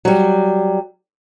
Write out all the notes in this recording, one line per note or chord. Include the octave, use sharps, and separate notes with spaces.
F#3 G3